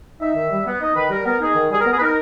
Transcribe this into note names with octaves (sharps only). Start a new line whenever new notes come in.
D#4 E5
D#3
G3
B3
D#4 D#5
D#3 B4
G3 A#4
B3 A#4
D#4 G#4
D#3
G3 G#4
A#4
B3 G#4
B4
D#4 A#4